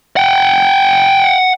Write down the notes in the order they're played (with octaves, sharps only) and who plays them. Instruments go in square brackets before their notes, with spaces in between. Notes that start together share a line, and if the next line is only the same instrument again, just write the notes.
[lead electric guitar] F#5 G5